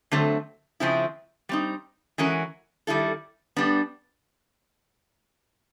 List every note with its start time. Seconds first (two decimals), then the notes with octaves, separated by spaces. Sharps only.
0.11 D3 F#3 A3 C4
0.80 C#3 F3 G#3 C4 E4
1.49 G3 C4 D#4
2.18 E3 G#3 C#4 F#4 A#4
2.87 D#3 G3 B3 E4 A4
3.56 G3 B3 D4